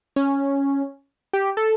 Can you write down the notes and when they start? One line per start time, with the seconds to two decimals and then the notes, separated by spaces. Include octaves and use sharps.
0.16 C#4
1.33 G4
1.57 A4